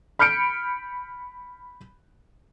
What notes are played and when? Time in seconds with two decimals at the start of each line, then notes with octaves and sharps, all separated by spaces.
0.19 B5 F6 G6 C#7 D7